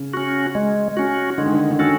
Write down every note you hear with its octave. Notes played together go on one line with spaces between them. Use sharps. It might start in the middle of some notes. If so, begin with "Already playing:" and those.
Already playing: C#3
C#4 F#4
G#3
C#4 F#4
D3 G#3
D#3
D3
D3
D#3 C#4 F#4 A4